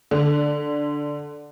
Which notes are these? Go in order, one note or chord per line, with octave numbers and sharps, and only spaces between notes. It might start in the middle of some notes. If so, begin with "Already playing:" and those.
D3